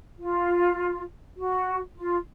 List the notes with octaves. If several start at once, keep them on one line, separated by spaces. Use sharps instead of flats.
F4
F#4
F4